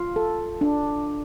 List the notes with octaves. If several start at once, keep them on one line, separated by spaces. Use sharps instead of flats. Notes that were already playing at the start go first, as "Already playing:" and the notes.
Already playing: F4
A4
D4